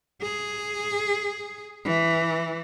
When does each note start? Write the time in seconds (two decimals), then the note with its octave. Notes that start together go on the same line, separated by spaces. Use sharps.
0.22 G#4
1.85 E3